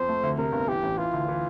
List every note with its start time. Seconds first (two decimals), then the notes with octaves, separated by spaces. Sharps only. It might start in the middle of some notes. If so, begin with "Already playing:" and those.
Already playing: F2 C5
0.09 A3
0.23 D2
0.38 C3 A#4
0.52 G1
0.68 E3 G4
0.83 A1
0.98 E3 F4
1.13 D2
1.29 E3